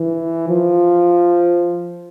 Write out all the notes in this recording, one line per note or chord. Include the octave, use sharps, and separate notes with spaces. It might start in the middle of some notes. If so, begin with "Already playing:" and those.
Already playing: E3
F3